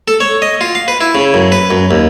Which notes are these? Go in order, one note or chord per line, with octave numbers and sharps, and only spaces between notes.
A4
C#5
D#5
F4
F5
B4
E4
C#3
F#2
B4
F#2
D#2